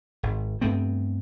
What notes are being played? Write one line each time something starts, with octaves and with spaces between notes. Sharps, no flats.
G#1
G2 A3 B3 C4